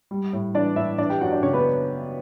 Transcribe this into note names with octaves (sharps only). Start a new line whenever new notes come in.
G3
A2
E3 D4 D5
A2 E4 E5
E3 D4 D5
G4 G5
F#2 F#4 F#5
D4 D5
C#3 C#4 C#5
B3 B4